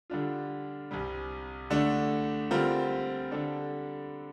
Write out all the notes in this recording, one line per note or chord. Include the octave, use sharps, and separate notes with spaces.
D3 G3 D4 F4
C2 C3 G3
D3 A3 D4
D3 G3 C4 F4 A#4
D3 G3 D4 A4